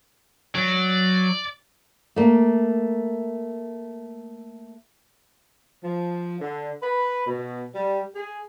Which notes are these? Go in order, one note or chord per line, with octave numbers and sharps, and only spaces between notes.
F#3 D5
A3 A#3
F3
D3
B4
B2
G3
G#4